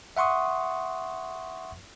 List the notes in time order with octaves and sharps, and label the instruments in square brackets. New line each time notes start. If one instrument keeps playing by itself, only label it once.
[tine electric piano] E5 F#5 C6 C#6 D#6